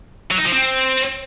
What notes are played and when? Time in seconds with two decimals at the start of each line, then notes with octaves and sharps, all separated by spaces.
0.31 F#3
0.38 D#4
0.45 F3
0.52 C4